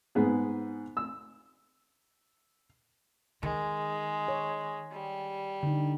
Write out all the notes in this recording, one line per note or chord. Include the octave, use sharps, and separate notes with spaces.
G#2 B3 G#4
E6
D#3 G#3
C#5
G3
D3 D#4